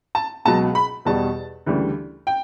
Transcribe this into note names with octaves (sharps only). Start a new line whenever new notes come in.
A5
C#2 B2 F#3 A5
B5
E2 B2 G3 A5
D2 C#3 E3 G3
G5